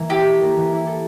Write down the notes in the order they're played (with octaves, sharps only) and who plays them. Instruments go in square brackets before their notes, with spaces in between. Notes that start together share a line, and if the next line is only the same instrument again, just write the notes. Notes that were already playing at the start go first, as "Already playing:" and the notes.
Already playing: [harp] E3 A#3
[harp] E4 [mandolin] G4
[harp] A4
A#3
E3
E4
A4